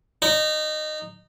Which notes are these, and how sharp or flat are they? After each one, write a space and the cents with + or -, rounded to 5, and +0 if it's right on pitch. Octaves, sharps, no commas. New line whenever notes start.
D#4 -20